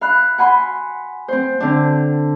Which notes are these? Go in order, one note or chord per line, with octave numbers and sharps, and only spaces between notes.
F5 B5 F#6
F#5 G#5 B5 C6
C4 C5
D3 C4 D4